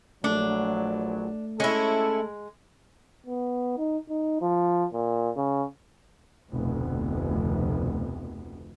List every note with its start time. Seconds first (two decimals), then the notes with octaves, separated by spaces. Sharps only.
0.24 A#1 F#3 A3 D4
1.60 G#3 C#4 E4 A4
3.26 B3
3.78 D#4
4.09 D#4
4.41 F3
4.93 A#2
5.37 C#3
6.52 F1 D2 B2